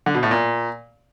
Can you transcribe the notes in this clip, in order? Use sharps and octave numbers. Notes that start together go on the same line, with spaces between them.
D3
B2
A2
A#2